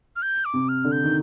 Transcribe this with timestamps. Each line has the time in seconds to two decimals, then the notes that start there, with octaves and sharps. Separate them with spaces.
0.16 F6
0.22 G6
0.45 D6
0.54 C3
0.69 F6
0.84 D3
0.92 G6
1.04 D#3